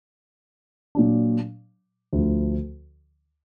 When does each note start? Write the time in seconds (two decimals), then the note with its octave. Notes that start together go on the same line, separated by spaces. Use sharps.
0.95 A#2 F#3 D4
2.13 D2 D3 F3